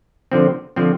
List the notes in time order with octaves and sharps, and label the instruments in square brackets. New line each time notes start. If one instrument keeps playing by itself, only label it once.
[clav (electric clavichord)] D3 F3 C4
D3 F3 C4